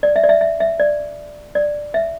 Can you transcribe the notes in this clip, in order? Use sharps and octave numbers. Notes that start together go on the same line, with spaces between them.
D5
E5
D5
E5
E5
E5
D5
D5
E5